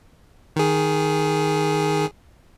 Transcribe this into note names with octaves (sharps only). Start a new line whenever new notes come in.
D#3 G#4